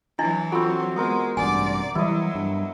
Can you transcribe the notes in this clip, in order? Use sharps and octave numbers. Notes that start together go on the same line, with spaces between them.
E3 F#3 D4 E4 D#5
C4 F4 F#4 A4
G#3 B3 A#4 C5
A1 G2 C3 D5 G#5
E3 F#3 G3 E4 D#5
G2